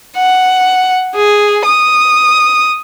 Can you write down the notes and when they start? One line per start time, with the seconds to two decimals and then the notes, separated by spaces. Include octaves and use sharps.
0.16 F#5
1.15 G#4
1.64 D#6